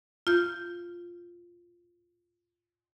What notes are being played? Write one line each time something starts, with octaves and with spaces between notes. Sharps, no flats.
F4 G6